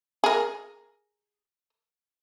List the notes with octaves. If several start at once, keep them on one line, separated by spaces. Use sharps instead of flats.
G#4 A#4